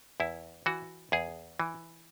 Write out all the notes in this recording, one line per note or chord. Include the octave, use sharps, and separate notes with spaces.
E2 E4
E3 F#4
E2 G#4
E3